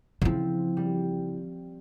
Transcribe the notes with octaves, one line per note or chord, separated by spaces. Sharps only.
C#3 F3 C4 E4
G3